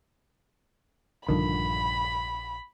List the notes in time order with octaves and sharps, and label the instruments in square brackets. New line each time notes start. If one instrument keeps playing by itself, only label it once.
[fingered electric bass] A#1 F3 [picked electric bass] G2 D3 D#3 [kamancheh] B5